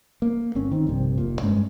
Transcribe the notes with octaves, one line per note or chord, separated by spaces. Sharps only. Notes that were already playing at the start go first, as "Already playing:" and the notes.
A#3
G1 C4 C#4
D#3 C4
A#1 G2 C3
F1 A#2
G2 G#3 C#4